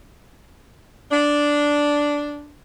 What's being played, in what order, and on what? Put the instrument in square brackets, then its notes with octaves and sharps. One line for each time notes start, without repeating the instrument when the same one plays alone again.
[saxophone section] D4